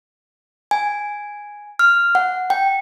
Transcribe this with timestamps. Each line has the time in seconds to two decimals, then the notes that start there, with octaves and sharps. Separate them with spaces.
0.71 G#5
1.79 F6
2.15 F#5
2.50 G5